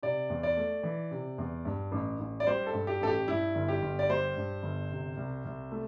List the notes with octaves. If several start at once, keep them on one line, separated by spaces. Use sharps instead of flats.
C3 D5
E2
D5
A3
E3
C3
E2
G2
A1
A1
D5
G3 C5
A4
G2
G4
A1 A4
G4
G2 E4
G1
G4
G1
D5
G3 C5
G2
G1
C3
C2
C2
A3